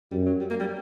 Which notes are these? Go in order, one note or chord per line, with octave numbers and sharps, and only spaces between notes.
F#2 G3
F#3
G3
A#3
G3